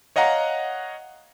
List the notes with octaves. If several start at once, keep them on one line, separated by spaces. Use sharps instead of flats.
C#5 D#5 F5 F#5 A#5